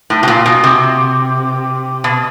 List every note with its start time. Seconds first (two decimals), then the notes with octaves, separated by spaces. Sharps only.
0.10 A2
0.23 B2
0.28 A#2
0.46 B2
0.64 C3
2.04 B2